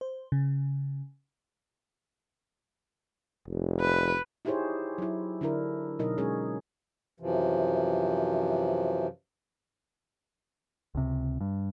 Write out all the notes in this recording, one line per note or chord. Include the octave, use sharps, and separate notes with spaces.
C5
C#3
F1
B4
D#4 E4 G4 G#4 C5 C#5
F#3 E4
D3 D4 E4 A#4
B2 F#3 D#4 A#4 D#5
G#3 C#4 G#4 C#5
F#2 C3 E3 F3
C#2 C3
G2